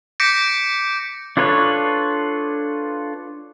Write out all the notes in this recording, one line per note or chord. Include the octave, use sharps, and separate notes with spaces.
D6 G6 A#6 B6 C#7 D7
D4 F4 A4 B4 C#5